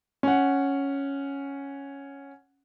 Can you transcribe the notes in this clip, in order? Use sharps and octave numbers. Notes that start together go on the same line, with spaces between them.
C#4 F#5